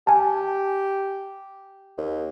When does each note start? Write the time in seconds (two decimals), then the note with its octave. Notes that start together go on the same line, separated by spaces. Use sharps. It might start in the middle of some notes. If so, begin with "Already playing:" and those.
0.07 G4 G#5 A5
1.98 D#2